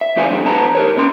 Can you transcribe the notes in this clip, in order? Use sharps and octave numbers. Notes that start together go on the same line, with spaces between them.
E5
C#2 E3 F4 D5 F5 G#5
D3 F#3 D4
E2 B2 B3 A5 A#5
G4 A#4 C#5
A#2 C#4 C6